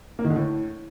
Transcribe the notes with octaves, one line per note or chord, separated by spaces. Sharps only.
A#3
D#3
D3
A2